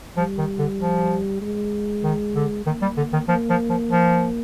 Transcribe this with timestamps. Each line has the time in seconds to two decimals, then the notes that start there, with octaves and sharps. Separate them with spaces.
0.17 F3 G3
0.38 D#3
0.59 D3
0.80 F3
1.41 G#3
2.03 D#3
2.35 D3
2.66 D#3 A#3
2.82 G3
2.97 D3
3.13 D#3
3.28 F3 A#3
3.49 F3
3.70 F3
3.91 F3